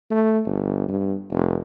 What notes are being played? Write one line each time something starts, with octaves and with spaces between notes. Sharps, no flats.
A3
G1
G2
F1